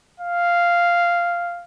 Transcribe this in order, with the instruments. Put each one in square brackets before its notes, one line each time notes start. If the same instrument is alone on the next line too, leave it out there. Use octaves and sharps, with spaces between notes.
[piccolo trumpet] F5